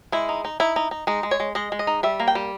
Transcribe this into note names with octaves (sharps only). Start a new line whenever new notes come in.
G#3 E4
D#4
D#4
D#4 E4
D#4
D#4
G#3 D#4
G#3
C#5
G#3
G#3 D#5
G#3
D#5
D#4
G3 E5
A#3
G5
G3